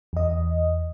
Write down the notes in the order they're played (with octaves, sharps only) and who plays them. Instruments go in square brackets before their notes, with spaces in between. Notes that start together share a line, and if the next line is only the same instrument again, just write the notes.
[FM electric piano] E2 D#5